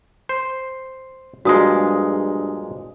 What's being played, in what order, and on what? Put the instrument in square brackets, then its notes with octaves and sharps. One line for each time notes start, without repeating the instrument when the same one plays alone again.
[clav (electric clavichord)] C5
[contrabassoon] G2 [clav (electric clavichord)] A#2 F3 G#3 [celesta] F#4 D#6